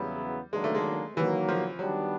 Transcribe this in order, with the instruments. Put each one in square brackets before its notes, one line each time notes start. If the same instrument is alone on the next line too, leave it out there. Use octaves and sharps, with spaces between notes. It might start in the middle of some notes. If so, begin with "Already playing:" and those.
Already playing: [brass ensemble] E2 C#3 F#3 B3 E4 [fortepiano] G3
[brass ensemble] D#3 F#3 A#3 D4 [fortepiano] G#3
[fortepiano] A3
G#3
[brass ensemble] D#3 F#3 A#3 [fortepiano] E3
[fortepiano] F3
[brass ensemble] D#3 G3 B3 D4 [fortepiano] F#3